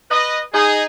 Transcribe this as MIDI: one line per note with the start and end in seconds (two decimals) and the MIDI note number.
0.11 0.40 71
0.11 0.40 75
0.54 0.84 63
0.54 0.84 68